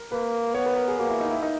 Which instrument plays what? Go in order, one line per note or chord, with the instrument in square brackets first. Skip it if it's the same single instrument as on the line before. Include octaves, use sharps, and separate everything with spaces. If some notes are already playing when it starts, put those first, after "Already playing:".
Already playing: [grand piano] A#4
[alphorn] A#3 [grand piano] B4
[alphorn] B3 [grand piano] C#5
[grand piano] B4
A#4
G#4
[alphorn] A#3 [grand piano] F#4
[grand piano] E4
D#4
E4
D#4